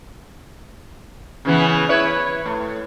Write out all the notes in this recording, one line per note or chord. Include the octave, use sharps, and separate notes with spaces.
C#3 E3 B3
E4 B4 C#5
A2